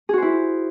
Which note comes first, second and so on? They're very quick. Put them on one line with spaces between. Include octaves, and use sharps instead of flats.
G#4 F#4 C5 E4